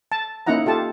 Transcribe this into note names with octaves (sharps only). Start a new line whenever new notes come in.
A5
A#3 C#4 D#4 E4 F#5 A#5
F4 G4 A4 A5